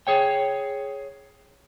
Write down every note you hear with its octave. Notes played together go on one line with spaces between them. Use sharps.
G#4 C#5 G5